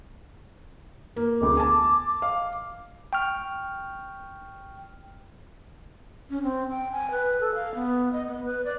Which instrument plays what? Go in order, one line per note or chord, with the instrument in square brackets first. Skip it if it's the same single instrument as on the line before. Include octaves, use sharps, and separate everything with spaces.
[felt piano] A#3
[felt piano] E1 D2 [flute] D6
[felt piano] G#5 A5
F5
[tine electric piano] G5 C#6 F6
[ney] C#4
C4
G5
G#5
B4
A4
F5
B3
D#5
B3
B4
D5